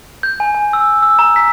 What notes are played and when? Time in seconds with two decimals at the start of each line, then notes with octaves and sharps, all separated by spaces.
0.23 G6
0.40 G#5
0.55 G#5
0.73 E6
1.03 E6
1.19 A#5
1.36 B6